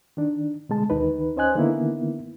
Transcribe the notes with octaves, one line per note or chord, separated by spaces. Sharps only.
D#3 D4
B2 D3 G#3 A5
D2 D#3 D#4 B4
C#4 C5 D#5 G#5 F#6
D3 D#3 A#3 B3 E4